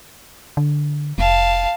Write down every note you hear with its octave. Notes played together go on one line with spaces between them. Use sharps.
D3
F1 F5 A5